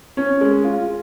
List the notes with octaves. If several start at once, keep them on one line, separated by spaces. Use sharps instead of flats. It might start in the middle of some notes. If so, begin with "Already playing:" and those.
C#4
G#3
F4